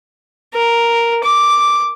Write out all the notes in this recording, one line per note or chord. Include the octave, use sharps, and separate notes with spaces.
A#4
D6